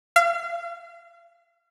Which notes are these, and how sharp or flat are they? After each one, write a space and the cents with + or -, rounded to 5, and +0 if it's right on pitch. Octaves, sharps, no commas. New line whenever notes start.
F5 -40